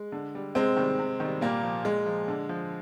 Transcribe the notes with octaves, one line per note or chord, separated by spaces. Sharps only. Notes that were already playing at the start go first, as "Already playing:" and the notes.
Already playing: G#3
D3
G3
C3 G#3 C4
D#3 G3
C3
D#3
G3
A#2 G3 A#3
F3
A#2 G#3
F3
D3
F3